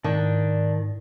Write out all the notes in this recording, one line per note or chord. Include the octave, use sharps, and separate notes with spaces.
G#2 D#3 D5 A5